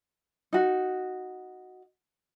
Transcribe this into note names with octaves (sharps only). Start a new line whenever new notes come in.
D#4 F#4